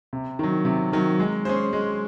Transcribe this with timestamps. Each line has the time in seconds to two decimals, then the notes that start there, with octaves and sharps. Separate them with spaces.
0.13 C3
0.39 D#3 F#3
0.65 C3
0.93 D#3 F#3
1.20 G#3
1.45 C#4 G#4 C5
1.73 G#3